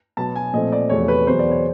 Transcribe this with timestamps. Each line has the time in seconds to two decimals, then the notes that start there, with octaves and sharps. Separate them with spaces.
0.17 B2 F#3 B3 A5
0.36 G#5
0.53 A#2 F3 A3 C4 D#5
0.72 D5
0.89 E2 C3 F3 A3 C#5
1.08 B4
1.27 E2 B2 F#3 B3 C5
1.39 D5
1.51 C#5